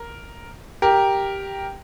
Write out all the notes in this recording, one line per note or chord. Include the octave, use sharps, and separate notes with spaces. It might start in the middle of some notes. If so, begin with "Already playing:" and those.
Already playing: A#4
G4 A#4